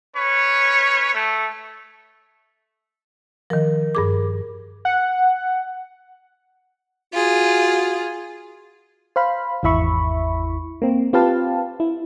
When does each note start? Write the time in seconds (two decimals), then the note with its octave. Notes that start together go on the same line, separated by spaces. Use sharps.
0.17 C#4 B4 C#5
1.14 A3
3.50 D#3 F3 A#4
3.95 G2 G#4 D6
4.85 F#5
7.14 F4 F#4 G#4
9.16 C5 F5 B5
9.63 G#1 E2 E4 E5 B5 C#6
10.82 A#3 C4
11.13 C4 F4 G4 B4 F5 A5
11.80 E4